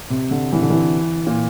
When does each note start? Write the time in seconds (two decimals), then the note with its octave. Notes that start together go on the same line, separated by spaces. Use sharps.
0.10 C3
0.31 D3
0.53 E3
0.61 D3
0.70 E3
1.27 A#2